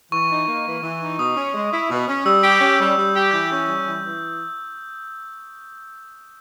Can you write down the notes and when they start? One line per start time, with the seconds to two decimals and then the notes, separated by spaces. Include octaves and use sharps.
0.12 E3 C#6
0.30 D#4
0.48 A#3
0.66 E3
0.83 E3
1.01 D#4
1.18 B2 D#6
1.36 C#4
1.54 G#3
1.72 E4
1.90 B2
2.07 C#4
2.25 G3 E6
2.43 G4
2.52 G6
2.61 C#4
2.79 G3
2.97 G3
3.14 G4
3.31 E3 G6
3.49 C#4
3.67 G3
3.85 E3
4.03 E3